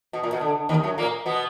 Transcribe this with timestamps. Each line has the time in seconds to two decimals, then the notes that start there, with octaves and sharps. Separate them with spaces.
0.13 B2
0.23 A#2
0.32 B2
0.41 D3
0.69 D#2 D#3
0.83 F#2 F#3
0.98 A#2 A#3
1.26 B2 B3